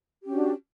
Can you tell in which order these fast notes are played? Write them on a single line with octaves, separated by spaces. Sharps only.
G4 C#4 F#4 D4